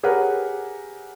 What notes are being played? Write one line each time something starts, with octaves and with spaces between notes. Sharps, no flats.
G4 G#4 A#4 B4 C#5 F#5